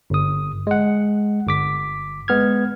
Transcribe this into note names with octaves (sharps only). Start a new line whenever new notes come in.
G1 D#6
G#3 F#5
G1 D6 B6
G#3 B3 F6 G#6